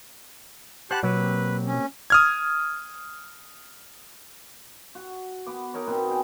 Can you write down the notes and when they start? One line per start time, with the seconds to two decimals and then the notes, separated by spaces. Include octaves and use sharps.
0.91 G4 C5 F#5 A5 B5 F#6
1.03 B2 F#3 A#3 C4 G4 B4
1.67 C#4
2.10 D#6 F6 G#6
4.95 F#4
5.46 B3 D6
5.74 D#4 A#4 C#5
5.87 B2 C4 B4
6.08 G#4 G5